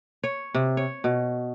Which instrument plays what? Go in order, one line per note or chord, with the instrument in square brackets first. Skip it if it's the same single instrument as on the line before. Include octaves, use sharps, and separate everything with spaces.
[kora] C#5
C3
C#5
B2